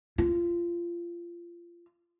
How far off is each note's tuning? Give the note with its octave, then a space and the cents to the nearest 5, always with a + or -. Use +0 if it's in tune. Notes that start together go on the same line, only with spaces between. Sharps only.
F4 -25